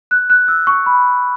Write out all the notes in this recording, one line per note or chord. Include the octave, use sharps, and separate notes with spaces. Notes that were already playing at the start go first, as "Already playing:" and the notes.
F#6
F#6
E6
C#6
B5